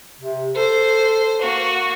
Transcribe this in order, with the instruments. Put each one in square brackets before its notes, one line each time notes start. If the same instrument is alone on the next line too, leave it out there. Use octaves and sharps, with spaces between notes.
[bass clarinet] C3
[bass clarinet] A4 [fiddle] C5
[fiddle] A#3 F#4